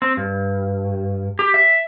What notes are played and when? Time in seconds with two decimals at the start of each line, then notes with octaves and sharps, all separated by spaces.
0.02 C4
0.17 G2
1.39 G4
1.54 E5